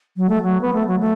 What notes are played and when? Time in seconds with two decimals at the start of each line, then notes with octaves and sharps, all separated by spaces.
0.17 F#3
0.29 A3
0.42 F#3
0.61 B3
0.74 A3
0.87 F#3
1.00 A3